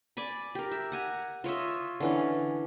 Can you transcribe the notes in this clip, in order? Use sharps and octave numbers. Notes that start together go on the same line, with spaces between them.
D5 G#5 B5
G4 A#4
E5
F#5 G#5 A#5
F4 C#5 D#5 E5
D3 E3 C#4